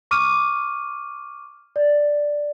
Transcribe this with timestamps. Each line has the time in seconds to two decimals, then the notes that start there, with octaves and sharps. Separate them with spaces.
0.11 C#6 D6 F6 D#7
1.76 D5